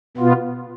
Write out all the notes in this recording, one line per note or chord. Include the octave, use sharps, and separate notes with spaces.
B2 B3 F4